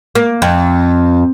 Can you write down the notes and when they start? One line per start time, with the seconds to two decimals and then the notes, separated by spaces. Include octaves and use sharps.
0.15 A#3
0.42 F2